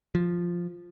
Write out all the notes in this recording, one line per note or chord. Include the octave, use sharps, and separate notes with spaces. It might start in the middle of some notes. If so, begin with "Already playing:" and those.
F3